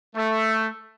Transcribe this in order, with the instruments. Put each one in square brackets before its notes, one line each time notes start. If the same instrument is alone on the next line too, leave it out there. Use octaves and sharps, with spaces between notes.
[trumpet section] A3